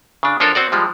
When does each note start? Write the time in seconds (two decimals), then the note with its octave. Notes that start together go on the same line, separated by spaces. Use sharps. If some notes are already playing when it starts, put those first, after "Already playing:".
0.23 C#3 D4
0.40 F3 D4 F4 A4 A#4 C#5
0.55 C4 F#4 D5
0.72 F3 G3 G#3